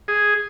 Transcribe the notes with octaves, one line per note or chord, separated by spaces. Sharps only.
G#4